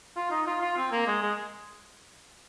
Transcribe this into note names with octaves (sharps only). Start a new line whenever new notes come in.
F4
D#4
F4
F4
C4
A#3
G#3
G#3